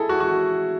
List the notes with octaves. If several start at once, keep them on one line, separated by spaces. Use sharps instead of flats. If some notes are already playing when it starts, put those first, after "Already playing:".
Already playing: E4 G#4 A4
F#4
F#4